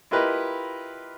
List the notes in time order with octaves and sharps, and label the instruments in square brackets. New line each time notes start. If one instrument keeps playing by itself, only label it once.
[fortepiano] E4 F4 G4 A#4 B4 D#5